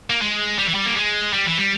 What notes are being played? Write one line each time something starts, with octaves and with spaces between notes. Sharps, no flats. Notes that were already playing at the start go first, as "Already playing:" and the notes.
A#3
G#3
G3
E3
G3
A#3
G#3
G3
E3
G3